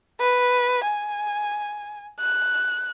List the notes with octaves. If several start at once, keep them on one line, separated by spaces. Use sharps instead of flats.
B4
G#5
F#6